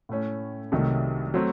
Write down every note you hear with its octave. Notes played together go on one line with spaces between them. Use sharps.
A2 A3 C#4
C2 C3 D#3 F#3 A3
F#3 A3 C4